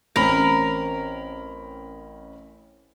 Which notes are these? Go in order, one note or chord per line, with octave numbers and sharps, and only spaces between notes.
A1 C4 C#4 A#4 B5 A#6